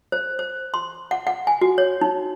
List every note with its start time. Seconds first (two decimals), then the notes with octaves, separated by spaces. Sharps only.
0.12 C5
0.39 C5
0.74 C6
1.11 F#5
1.27 F#5
1.47 G#5
1.61 F#4
1.78 C#5
2.01 D#4